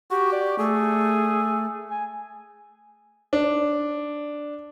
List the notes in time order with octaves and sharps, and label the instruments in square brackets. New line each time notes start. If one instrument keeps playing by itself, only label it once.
[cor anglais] F#4 [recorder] G4
[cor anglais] D5
[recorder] A3 [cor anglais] G#4
[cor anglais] G#5
[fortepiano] D4